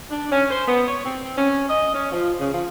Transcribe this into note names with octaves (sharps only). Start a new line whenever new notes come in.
D4
C#4
C5
B3
C#5
C4
C#4
D#5
C#4
F3
C#3
F3